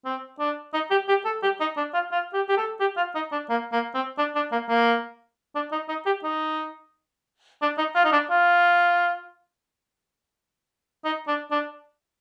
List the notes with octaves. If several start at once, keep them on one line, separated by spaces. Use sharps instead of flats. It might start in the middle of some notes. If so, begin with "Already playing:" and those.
C4
D4
D#4
G4
G4
A4
G4
D#4
D4
F4
F4
G4
G4
A4
G4
F4
D#4
D4
A#3
A#3
C4
D4
D4
A#3
A#3
D4
D#4
D#4
G4
D#4
D4
D#4
F4
D#4
D4
F4
D#4
D4
D4